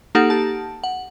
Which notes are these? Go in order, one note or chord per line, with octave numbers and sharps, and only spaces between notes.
A#3 D#4 G4 A4 F#5
G4 A5
F#5